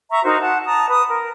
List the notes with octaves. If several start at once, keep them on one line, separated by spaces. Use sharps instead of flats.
E5 A#5 C#6
D#4 F#4 A#4 C5
F#5 A5
A5 A#5 D#6
B4 D#6
A#4